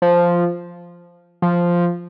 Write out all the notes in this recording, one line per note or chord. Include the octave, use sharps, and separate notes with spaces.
F3
F3